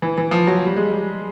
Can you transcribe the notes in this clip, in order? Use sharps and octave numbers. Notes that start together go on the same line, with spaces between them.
E3
E3
F3
F#3
G3
G#3
G3